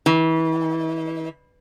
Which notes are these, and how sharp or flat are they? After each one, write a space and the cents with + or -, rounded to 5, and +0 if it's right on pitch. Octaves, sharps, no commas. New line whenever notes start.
E3 -30